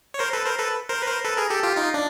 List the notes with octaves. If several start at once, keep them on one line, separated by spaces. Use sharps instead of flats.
C#5
A#4 C5
A4 B4
A#4 C5
A4 B4
A#4 C5
B4
A#4 C5
A4 B4
G#4 A#4
G4 A4
F4 G4
D#4 F4
D4